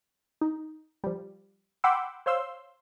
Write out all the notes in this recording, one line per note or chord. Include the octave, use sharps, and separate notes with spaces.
D#4
F3 G3
F#5 G5 B5 C6 D6 E6
C5 C#5 F5 C6 E6